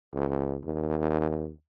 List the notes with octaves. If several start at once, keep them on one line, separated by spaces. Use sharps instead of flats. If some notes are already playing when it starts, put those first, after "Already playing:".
C#2
D#2